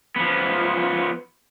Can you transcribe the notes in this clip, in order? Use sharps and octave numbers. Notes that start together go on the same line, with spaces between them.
F3 B3